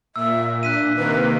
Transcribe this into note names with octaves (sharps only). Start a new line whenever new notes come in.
A#2 E5 E6
D4 F#6 B6 D#7
C3 D#3 A#3 B4